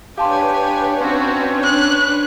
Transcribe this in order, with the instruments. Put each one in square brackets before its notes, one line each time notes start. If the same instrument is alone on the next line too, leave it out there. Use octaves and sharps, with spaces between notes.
[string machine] D4 B4 C#5 [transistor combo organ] G4 [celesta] F5 A5 C6 [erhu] G#5
[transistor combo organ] C4 C#4 [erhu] F#4
[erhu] F#6